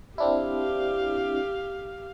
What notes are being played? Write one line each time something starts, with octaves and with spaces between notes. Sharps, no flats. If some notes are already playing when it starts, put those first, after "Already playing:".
C4 D4 E4 G4 F5